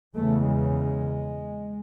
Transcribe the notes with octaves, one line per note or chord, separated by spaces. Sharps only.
E2 C#3 A3
G#3